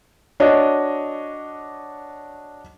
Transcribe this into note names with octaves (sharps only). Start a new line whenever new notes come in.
D4 F#4 C#5 D#5